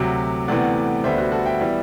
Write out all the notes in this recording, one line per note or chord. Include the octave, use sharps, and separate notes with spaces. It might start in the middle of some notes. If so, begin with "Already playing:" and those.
Already playing: D2 C3 F#3 E5
D2 C3 E3 B3 D5 F#5
D2 D3 G3 B3 C5 E5
F#4
F#4 A4
E5 G5
E3 G3 B3